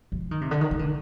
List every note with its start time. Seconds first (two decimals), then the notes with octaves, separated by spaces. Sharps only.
0.12 F3
0.31 D#3
0.41 C3
0.51 D3
0.61 D#3
0.71 D#3
0.79 D3